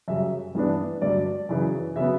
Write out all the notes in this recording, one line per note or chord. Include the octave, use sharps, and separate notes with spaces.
F#2 C#3 G3 E5
G2 E3 B3 D4
G2 D3 F#3 D5
F#2 C#3 E3
C#3 F#3 B3 E5